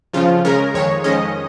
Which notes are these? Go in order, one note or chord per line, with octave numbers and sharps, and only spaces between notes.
F2 C#3 F3 F4
C#3 G#3 C#4 A#4
F2 D#3 G#3 C#5
F2 D#3 G#3 C#4 D#5